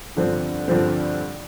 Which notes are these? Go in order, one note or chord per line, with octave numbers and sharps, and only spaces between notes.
G2 D3 F3 C4
G2 D3 F3 C4